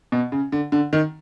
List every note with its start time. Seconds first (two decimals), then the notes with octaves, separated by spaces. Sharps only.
0.12 B2
0.32 C#3
0.52 D3
0.72 D3
0.93 D#3